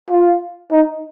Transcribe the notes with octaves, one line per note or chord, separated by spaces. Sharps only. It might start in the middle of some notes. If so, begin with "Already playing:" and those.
F4
D#4